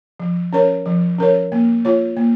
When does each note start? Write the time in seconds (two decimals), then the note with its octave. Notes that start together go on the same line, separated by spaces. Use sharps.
0.20 F3
0.53 C#4 A#4 C#5
0.86 F3
1.18 C#4 A#4 C#5
1.52 A#3
1.85 F4 C#5
2.17 A#3